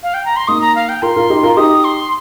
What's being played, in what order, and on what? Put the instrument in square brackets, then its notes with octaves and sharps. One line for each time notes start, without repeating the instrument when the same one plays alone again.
[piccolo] F5
G5
A#5
C6
[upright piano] A#3 D#4 [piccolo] D#6
[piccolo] A#5
F5
G5
[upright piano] F4 A#4 [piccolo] C6
[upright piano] F4 A#4
D#4 G4
F4 A#4
[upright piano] D#4 G4 [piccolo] D#6
[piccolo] C6